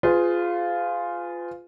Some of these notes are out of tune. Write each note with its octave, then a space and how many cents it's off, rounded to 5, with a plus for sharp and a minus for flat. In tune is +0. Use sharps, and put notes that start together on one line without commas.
F4 +0 G#4 +5 B4 +45